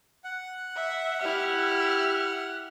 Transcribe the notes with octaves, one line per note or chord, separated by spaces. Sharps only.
F#5
E5
E4 G4 E5 F6